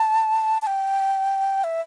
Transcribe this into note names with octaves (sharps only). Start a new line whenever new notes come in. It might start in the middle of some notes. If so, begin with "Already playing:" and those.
Already playing: A5
A5
G5
E5